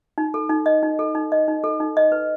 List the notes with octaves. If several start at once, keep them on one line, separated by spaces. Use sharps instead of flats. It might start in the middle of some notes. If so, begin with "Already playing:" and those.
D#4
A4
D#4
D#5
D#4
A4
D#4
D#5
D#4
A4
D#4
D#5
B4